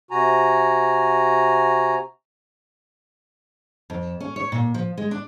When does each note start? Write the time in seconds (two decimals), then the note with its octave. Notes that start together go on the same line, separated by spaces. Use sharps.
0.11 C3 F#4 G#5 A#5
3.90 F2
4.20 C#4
4.36 C#5
4.52 A#2
4.74 F3
4.98 G#3
5.11 D4